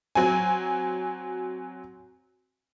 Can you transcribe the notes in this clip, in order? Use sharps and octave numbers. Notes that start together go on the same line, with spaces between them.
F#3 C4 G#5